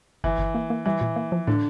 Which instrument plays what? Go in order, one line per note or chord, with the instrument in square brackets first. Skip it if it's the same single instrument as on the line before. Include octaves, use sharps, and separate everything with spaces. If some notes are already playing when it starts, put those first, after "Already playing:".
[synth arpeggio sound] G1 [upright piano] E3
[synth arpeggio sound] G1
A#3
A#3
[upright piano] E3 [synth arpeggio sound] G3
[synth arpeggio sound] A#2
A#3
F3
[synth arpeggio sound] A2 [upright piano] D3